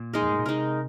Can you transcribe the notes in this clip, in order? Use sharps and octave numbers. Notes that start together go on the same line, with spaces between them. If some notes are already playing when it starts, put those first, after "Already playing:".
Already playing: A#2
G#3 D#4 A#4
F2
G#2
A#2
C3 G#3 D#4 A#4